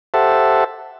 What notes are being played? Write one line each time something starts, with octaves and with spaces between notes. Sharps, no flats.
G4 A4 C5 E5 F#5 A5